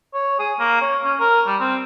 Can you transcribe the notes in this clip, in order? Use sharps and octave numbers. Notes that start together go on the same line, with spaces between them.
C#5
G#4
A#3
C#5
C#4
A#4
G3
C4